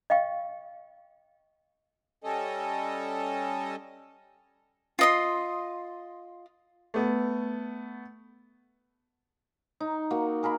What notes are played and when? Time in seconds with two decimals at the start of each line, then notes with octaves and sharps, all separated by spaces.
0.10 D#5 F5 G5 C#6
2.24 G3 C#4 A4 D#5
4.99 F4 D#5 C6
6.94 A3 B3
9.80 D#4
10.11 A#3 F#4
10.43 G#4 A#4 F5 B5